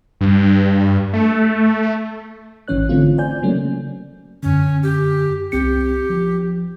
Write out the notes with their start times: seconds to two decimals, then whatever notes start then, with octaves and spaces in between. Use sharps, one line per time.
0.21 G2
1.13 A3
2.68 A1 G#2 E3 C#4 C#5 F#6
2.89 D3 E3 A3 C4 F4
3.18 C5 D5 G#5 G6
3.42 C#3 F#3 A3 A#3 C#4
4.43 F#2 D3 C#4
4.83 G4
5.52 C2 C4 G4 C#7
6.10 F3